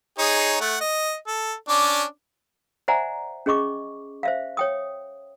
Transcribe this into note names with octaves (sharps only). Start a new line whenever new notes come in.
D#4 G#4 C#5
A3 F#5
D#5
A4
C#4 D4 D6
C5 D5 E5 F#5 G#5 A#5
C#4 G#4 D#5 C#6 D6
C5 E5 F5
C#5 G5 D#6